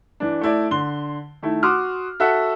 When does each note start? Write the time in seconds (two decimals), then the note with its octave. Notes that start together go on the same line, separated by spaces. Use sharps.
0.20 E3 D4
0.41 A3 E4 D5
0.71 D3 C6 G7
1.43 D#3 A3 E4
1.63 F#4 C6 D6 D#6 F6
2.20 F#4 A4 E5 F#5